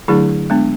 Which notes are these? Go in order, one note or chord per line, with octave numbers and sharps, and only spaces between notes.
D3 F#3 A3 D4 E4 G#4
G#3 B3 D4